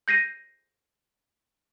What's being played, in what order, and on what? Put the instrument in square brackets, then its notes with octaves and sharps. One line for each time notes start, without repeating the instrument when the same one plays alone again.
[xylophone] G6 A#6 C7 D#7